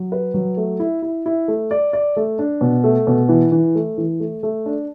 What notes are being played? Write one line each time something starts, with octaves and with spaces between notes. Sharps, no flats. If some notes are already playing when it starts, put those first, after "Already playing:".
Already playing: F#3
B4
F#3
A3
E4
E4
E4
A3
D5
D5
A3
D4
B2
A3
B2
E3
E3
A3
E3
A3
A3
D4